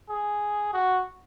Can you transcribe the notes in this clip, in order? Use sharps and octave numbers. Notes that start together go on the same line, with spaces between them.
G#4
F#4